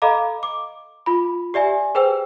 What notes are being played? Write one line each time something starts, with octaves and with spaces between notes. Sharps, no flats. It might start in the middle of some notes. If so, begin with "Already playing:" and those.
A4 D#5 F5 A#5 B5 D6
D6
F4 B5
G4 D5 E5 G#5
G#4 B4 C5 G5 E6